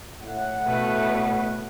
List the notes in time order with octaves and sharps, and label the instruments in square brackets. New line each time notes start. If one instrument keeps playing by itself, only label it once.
[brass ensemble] A2 F#5
[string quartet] B2 A3 B4